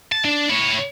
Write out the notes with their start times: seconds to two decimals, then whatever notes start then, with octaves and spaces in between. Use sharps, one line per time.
0.12 A5
0.25 D4
0.49 E4 C#5